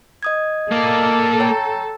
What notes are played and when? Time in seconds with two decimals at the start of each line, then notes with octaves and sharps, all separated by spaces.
0.23 D#5 D#6 G#6
0.71 A#3 A4 D5
1.40 C#5 G5 A#5